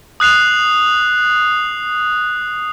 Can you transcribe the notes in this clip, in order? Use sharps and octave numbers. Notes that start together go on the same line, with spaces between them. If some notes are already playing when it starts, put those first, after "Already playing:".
D#6 F#6 C7 F7